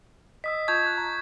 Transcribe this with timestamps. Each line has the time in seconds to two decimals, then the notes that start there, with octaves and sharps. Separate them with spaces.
0.44 D#5 D#6 E6 B6
0.68 F4 A5 C#6 G6 G#6
0.86 F#6
0.98 A#5